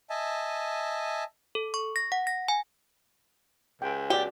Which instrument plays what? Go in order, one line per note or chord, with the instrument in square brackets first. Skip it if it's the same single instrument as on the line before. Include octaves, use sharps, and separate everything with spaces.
[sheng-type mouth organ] D#5 E5 G#5 A5
[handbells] A4
C#6
A#6
F#5
A#6
G#5
[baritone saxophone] C#2 [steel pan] G5
[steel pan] F#4 D5 [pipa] G4